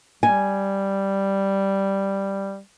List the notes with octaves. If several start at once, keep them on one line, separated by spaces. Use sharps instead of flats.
G3 G#5